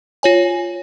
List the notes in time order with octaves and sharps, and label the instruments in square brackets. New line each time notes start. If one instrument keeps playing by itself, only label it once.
[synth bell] F4 C#5 G#5